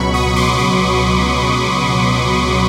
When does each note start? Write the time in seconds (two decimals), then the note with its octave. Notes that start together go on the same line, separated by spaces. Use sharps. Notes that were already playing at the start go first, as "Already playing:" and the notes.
Already playing: C#2 B2 F#3 B5 C#6
0.14 C#6 D#6
0.36 C6 D6
0.58 C6 D6